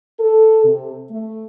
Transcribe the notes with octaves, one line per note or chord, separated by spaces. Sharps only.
A4
C3
A3